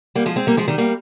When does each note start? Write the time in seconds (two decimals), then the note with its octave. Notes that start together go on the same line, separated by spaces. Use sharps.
0.15 G3 A#3
0.26 F3 G#3
0.36 G#3 C4
0.47 G3 A#3
0.57 F3 G#3
0.68 D#3 G3
0.78 G3 A#3